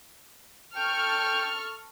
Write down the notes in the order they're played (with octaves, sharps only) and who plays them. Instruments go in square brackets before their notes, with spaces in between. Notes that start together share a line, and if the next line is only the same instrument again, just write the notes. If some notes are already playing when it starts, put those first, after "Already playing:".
[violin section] A4 C#6 F6 [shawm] G5